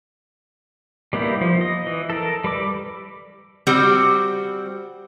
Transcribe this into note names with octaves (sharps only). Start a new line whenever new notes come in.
G3 A#3 B3 D#4 E4
F3
D#5
E3
A4 A#4
G3 B4 D6
G3 C4 F#4